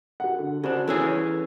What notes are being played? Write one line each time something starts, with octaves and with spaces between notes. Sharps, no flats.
F#4 F#5
D3
C#3 D4 F#4 C5
E3 C#4 G#4 A4 E6